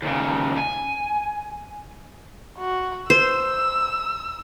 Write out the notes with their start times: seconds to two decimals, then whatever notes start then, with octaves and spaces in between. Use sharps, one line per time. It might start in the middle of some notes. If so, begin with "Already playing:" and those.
0.02 D#2 C#3
0.58 G#5
2.58 F#4
3.10 C5 E6